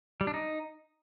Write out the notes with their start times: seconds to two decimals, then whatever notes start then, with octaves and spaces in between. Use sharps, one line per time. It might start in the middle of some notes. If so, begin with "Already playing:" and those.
0.21 G3
0.27 D4
0.34 D#4